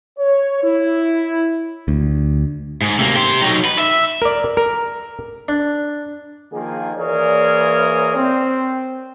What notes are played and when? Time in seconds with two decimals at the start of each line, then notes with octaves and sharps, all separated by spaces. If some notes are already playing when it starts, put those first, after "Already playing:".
0.19 C#5
0.63 E4
1.88 D2
2.81 G#2
2.98 C3 A#3
3.16 G4 C5
3.41 F#3 D#4
3.65 B4
3.79 E5
4.22 A#4 D5
4.57 A#4
5.48 D4
6.52 D#3 F3 A#3 G#4
6.97 E3 A#3 G#4 A#4 C#5 D5
8.16 C4